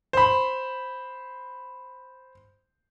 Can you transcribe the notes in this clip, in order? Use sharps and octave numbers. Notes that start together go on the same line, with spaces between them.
C5 B5